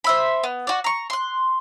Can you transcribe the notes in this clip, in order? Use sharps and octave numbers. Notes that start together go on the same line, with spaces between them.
C5 E5 B5
B3
F#4 D5
A#5 C#6
C6 F#6